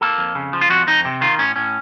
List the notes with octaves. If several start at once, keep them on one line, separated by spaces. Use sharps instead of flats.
A#3 A4
F2
C#3
F3
F4
F2 F#4
F2 D#4
C3
D#3 F4
A2 C#4
A2 C#4